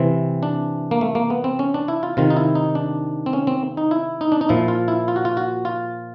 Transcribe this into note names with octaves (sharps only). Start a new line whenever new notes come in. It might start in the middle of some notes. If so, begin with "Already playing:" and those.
Already playing: C3 E3 C4
D4
A#3
A3
A#3
B3
C4
C#4
D4
E4
F4
C3 D#3 F4
D#4
E4
D#4
D4
C4
C#4
C4
D#4
E4
D#4
D4
D#4
A#2 F3 E4
F4
E4
F4
F#4
F4
F#4
F4